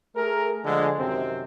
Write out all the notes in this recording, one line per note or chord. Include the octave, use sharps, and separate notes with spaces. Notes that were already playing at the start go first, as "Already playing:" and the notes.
A3 G#4 A#4
D3 F3 G#3
F#2 C3 D#3 C4